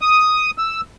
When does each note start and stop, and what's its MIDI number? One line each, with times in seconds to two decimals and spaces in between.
0.01 0.51 87
0.58 0.81 88